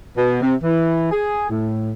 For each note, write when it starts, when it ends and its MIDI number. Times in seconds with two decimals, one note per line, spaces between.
0.17 0.39 47
0.42 0.54 48
0.62 1.10 52
1.11 1.48 68
1.49 1.93 45